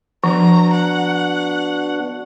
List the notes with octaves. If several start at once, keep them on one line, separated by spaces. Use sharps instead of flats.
F3 B3 D4 F#4 A#5
F#5